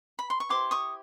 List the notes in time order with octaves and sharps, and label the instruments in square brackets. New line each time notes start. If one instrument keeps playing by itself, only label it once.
[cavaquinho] B5
C6
C#6
E4 G4 C5 C6 D6
C#6 D#6